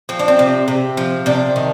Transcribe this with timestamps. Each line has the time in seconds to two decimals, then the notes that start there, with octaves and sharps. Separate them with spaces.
0.09 F3 C4
0.19 D4
0.28 C4
0.39 C3
0.68 C3
0.97 F3
1.26 C3 D4
1.56 D#3